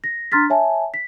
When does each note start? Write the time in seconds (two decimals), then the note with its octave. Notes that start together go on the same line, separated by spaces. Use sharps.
0.04 A#6
0.32 D4 A#5 C6 F6 A6 B6
0.50 C#5 E5 G#5 A5
0.94 B6